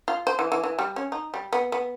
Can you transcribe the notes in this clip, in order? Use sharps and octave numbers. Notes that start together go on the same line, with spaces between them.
F4
C5
E3
E3
E3
G3
C#4
D#4
G3
B3
B3